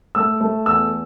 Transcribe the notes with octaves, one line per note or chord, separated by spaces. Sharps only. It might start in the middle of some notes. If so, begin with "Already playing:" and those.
A3 E6
A3
E2 E6